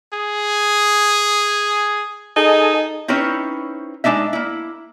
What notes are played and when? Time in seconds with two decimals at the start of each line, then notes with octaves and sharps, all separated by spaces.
0.14 G#4
2.36 D#4 G#4 A4 D#5
3.08 C4 C#4 D#4 E4 B4 C#5
4.04 G#3 A3 D4 D#4 E5
4.33 A#3 E4